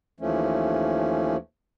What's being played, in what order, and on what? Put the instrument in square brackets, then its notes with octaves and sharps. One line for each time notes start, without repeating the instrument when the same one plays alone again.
[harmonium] D#2 E3 F3 A3 C#4